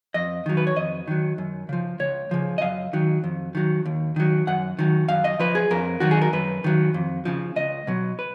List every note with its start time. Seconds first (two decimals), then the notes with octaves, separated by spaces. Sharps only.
0.14 F2 D#5
0.46 D#3 F#3
0.57 B4
0.67 C#5
0.76 F2 D#5
1.08 D#3 F#3
1.38 F#2
1.69 C#3 F3
1.99 C#2 C#5
2.31 C#3 F3
2.58 D#5
2.62 F#2 F5
2.93 D#3 F#3
3.24 F2
3.55 D#3 F#3
3.86 D#2
4.16 D#3 F#3
4.47 F#2 F#5
4.79 D#3 F#3
5.08 F#2 F5
5.24 D#5
5.39 F3 B4
5.55 G#4
5.71 F2 A#4
6.00 D#3 F#3 F#4
6.11 G#4
6.22 A#4
6.33 F#2 B4
6.64 D#3 F#3
6.94 F2
7.25 C#3 F3
7.56 C#2 D#5
7.87 B2 F#3
8.19 B4